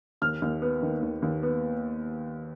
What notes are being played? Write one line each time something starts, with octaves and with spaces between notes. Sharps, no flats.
D#2 F6
D#2
B3
D#3
D#2
D#2
B3